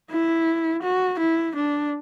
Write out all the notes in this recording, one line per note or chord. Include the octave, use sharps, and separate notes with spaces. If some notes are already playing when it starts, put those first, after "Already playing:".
E4
F#4
E4
D4